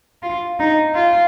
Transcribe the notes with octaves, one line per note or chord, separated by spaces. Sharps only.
F4
D#4
F4